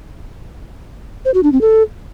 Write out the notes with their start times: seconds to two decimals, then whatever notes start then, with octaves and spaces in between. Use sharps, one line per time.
1.25 C5
1.34 F#4
1.43 D4
1.52 C4
1.61 A4